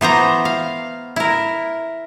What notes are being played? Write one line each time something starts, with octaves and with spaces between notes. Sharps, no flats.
E3 B3 C5 A#5
F5
E4 A#4